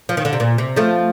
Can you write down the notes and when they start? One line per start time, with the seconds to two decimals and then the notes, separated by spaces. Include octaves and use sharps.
0.09 F3
0.17 D#3
0.25 D3
0.33 C3
0.40 A#2
0.58 C3
0.76 F3 A3